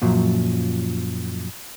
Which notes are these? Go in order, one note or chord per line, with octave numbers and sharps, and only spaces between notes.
F#2 A#2 F3 F#3